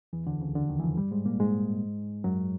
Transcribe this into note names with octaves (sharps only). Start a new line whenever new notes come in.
E2 E3
D2 D3
C#2 C#3
D2 D3
D#2 D#3
E3
F2 F3
G2 G3
G#2 G#3
A#2 A#3
G#2 G#3
F#2 F#3